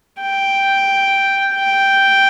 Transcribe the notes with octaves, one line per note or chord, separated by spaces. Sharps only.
G5
G5